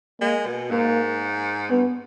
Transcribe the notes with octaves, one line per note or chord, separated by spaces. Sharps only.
G#3 A#3
B2
G#2 A#3
G2 B3